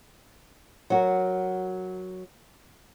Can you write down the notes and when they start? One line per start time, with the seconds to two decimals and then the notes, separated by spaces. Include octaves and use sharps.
0.90 F#3 F#4 A#4